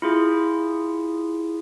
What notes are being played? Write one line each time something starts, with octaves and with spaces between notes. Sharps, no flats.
E4 F4 G#4